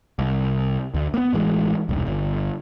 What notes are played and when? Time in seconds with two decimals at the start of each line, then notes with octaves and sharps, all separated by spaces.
0.19 C2
0.94 D2
1.14 A#3 B3
1.33 A1 E3 G#3
1.89 E1 C2
2.07 G1